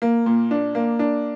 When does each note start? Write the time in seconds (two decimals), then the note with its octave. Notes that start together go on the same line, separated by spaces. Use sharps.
0.02 A#3
0.26 A#2
0.51 D4
0.75 A#3
0.99 D4